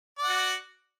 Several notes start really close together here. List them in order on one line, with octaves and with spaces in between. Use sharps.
D5 F#5 F#4